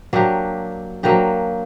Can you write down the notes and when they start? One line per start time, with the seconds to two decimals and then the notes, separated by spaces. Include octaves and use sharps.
0.13 F#3 A#3 D4 G4
1.03 F#3 A#3 D4 G4